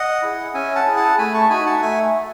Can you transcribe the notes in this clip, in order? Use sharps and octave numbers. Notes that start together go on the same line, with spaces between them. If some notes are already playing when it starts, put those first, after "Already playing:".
Already playing: D#5 F#5
E4 G#4
C#4 E5 G#5
F#5 A5
E4 G#4
F#5 A5
A3 G#5 B5
A5 C#6
D#4 F#4 G#5 B5
F#5 A5
A3 E5 G#5